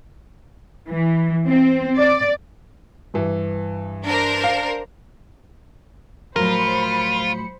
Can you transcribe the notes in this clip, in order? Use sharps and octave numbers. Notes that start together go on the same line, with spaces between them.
E3
C4
D5
G2 E3
D4 A#4 C5
F5
A2 F3 F#3 F4 A#4 C5 B5 C#7